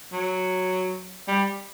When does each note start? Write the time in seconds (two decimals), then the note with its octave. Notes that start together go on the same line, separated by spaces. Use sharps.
0.12 F#3
1.28 G3